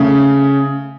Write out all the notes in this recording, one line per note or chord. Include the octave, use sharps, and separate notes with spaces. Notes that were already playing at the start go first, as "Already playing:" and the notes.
Already playing: C#3 A3